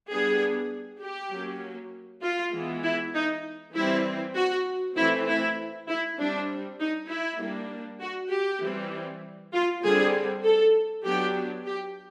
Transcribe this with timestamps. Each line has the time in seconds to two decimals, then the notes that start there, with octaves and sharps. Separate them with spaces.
0.10 G3 B3 D4 G#4
1.02 G4
1.31 F#3 A#3 C#4
2.23 F4
2.53 E3 G#3 B3
2.84 E4
3.14 D#4
3.75 E3 G3 C4 E4
4.36 F#4
4.97 E3 A3 C4 E4
5.28 E4
5.89 E4
6.18 G3 C4 D4
6.80 D#4
7.09 E4
7.40 G3 A#3 D4
8.01 F#4
8.31 G4
8.62 E3 G3 C4
9.53 F4
9.83 D3 G3 C4 G#4
10.44 A4
11.04 F#3 B3 D4 G4
11.66 G4